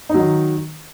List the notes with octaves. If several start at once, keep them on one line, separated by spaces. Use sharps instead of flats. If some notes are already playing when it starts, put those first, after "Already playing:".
D#3 F#3 D#4